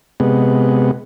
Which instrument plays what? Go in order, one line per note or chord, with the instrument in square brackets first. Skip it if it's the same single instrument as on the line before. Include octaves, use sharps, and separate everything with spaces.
[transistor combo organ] C3 G#3 B3